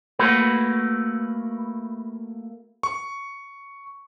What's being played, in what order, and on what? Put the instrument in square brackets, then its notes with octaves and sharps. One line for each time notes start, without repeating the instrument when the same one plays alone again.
[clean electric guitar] A3 A#3 F#4 B4
[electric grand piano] C#6